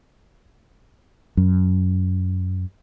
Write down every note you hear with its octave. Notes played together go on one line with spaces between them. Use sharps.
F#2